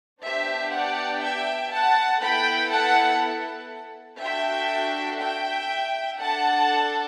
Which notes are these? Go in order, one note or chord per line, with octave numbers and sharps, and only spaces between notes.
B3 D4 G4 C5 E5
D5 F#5
E5 G5
F#5 A5
B3 E4 A4 G5 B5
F#5 A5
D4 F#4 A4 E5 G5
E5 G5
D4 A4 F#5 A5